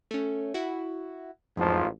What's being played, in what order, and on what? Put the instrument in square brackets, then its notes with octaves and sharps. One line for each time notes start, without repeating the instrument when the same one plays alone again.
[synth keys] A3 C#4
E4 F#4
[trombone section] A1 G#2 F3 [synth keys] F2